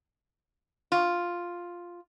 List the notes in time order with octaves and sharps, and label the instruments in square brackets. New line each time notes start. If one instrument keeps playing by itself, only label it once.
[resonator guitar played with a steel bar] F4